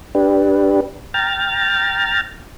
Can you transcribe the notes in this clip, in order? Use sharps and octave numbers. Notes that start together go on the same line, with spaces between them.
D4 G4 B4
G5 A#5 F6 A6